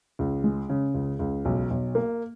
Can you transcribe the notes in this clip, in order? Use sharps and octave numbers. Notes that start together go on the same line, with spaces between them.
C#2
G#3
C#3
C#2
C#2
B1
B1
A#3